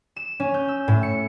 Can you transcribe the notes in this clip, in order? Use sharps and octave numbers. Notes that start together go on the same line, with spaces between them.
E7
C#4
G6
E6
A2
C#7